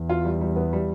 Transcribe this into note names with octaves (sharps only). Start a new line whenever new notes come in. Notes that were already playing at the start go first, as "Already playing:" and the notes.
Already playing: E2
F4
G3
G3
B3
G3